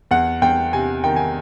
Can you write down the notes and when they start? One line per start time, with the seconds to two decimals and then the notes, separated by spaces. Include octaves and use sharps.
0.11 E2 F#5
0.42 E2 G5
0.73 C3 G#5
1.04 D#3 G5
1.16 G#5